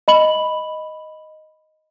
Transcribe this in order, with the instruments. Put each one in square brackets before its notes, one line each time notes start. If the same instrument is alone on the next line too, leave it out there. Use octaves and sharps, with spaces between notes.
[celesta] D#5 B5 F#7